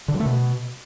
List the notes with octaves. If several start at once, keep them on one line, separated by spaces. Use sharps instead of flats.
D3
F#3
A3
B2